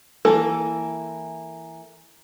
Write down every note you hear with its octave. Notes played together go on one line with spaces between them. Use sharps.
E3 A#3 A4